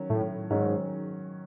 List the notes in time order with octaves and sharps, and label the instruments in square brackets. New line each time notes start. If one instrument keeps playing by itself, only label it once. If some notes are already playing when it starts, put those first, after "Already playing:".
Already playing: [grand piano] D#3 F#3 C#4
[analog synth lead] A2
[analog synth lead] G#2 [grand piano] D#3 F#3 C#4